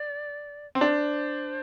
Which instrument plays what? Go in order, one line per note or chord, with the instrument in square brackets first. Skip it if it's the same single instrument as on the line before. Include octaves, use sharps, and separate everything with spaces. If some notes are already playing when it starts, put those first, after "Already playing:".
Already playing: [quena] D5
[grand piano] C4
[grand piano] D4 [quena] C5